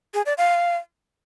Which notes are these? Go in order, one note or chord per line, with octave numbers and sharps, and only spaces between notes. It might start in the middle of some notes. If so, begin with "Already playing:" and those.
G#4
D5
F5